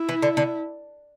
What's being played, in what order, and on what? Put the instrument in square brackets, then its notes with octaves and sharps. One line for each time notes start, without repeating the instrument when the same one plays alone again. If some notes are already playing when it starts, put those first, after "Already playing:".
Already playing: [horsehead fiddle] E4
[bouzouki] E3
D3
D3